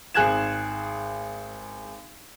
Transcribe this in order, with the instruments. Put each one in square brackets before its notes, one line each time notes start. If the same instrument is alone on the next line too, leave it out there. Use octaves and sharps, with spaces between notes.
[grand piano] G#1 G#4 F#6 G#6 E7